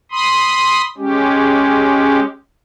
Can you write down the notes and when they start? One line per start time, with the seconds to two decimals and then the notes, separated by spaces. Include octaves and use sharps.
0.11 B5 C6 D#6
0.97 G#3 C#4 G4